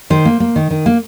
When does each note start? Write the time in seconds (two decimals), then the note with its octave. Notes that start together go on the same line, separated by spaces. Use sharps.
0.10 D#3 C5
0.25 A#3
0.40 A#3
0.56 D#3
0.71 D#3
0.86 A#3